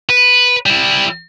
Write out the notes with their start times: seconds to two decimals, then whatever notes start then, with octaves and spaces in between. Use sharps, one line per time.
0.10 B4
0.66 G3 E4